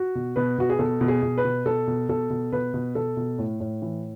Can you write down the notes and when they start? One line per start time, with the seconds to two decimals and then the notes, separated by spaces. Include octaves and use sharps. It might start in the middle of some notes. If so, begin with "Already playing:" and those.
Already playing: F#4
0.15 B2
0.36 B2 B4
0.58 B2 F#4
0.70 G#4
0.79 B2 A4
1.01 B2
1.08 G#4
1.23 B2
1.37 B4
1.45 B2
1.65 B2 A4
1.87 B2
2.09 B2 A4
2.30 B2
2.52 B2 B4
2.74 B2
2.95 B2 A4
3.17 B2
3.38 A2
3.60 A2
3.82 E3